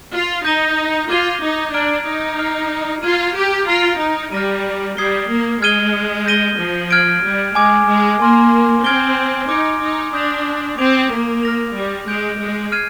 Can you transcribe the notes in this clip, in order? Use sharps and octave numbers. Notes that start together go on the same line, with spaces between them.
F4
D#4 G6 A#6 D#7 G7
F4 D6 G#6 D#7 G7
D#4
D4 A#5 F6 G#6 D7
D#4
A#5 F6 C7 F7
F4 F6 G#6 D#7
G4
F4 A#5 F6 A#6 D7 F7
D#4
G3 F6 A#6 D#7
G3 D#6 G#6 C7 G7
A#3
G#3 F6 G#6 D#7 G7
G6 A#6 D#7 G7
F3
F6 G#6 D7
G3
G#3 G#5 D6 G#6
G#3
A#3 G#5 C6 F6
C4 F6 G#6 D7 G7
D#4 D6 G#6 D7
D#4
D4 D#6 G6 A#6 F7
C4 D6 G#6 D7 F7
A#3
F6 A#6 F7
G3
G#3 G6 D7 F7
G#3
F6 G#6 C7 D#7